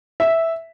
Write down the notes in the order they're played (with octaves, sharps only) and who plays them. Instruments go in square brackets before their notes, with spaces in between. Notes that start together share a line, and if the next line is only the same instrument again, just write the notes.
[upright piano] E5